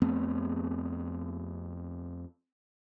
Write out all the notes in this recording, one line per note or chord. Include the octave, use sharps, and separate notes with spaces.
F2 A3 B3 C4